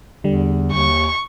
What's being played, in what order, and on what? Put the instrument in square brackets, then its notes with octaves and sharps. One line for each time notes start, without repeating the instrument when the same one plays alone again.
[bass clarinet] E2 [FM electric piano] D3 G3
[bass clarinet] D#2 [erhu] C#6